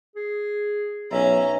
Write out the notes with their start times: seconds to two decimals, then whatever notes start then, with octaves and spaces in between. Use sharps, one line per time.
0.16 G#4
1.12 B1 C#4 E5 A#5